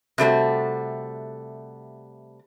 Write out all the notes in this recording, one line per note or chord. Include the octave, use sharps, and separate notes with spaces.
C3 G3 A3 F#4